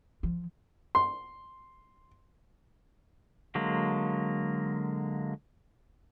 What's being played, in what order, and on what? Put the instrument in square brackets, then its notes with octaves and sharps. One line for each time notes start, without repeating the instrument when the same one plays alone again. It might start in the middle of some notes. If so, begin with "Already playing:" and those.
[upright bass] F3
[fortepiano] C6
[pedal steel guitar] D3 F#3 G#3 A#3